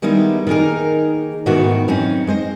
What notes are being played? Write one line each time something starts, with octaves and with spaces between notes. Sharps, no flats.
D#3 G3 G#3 B3 D#4 E4
D#3 A#3 D#4 G#4 A#4
G#2 B2 D#3 E3 A3 F#4
F#2 C4 C#4 D#4
G#3 C5 D#5